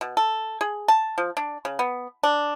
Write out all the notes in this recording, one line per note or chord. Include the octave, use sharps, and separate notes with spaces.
B2
A4
G#4
A5
F3
D4
C#3
B3
D4